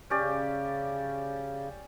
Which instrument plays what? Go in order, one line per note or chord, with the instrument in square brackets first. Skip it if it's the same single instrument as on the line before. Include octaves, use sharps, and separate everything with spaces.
[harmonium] C#3 [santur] C#4 G4 D5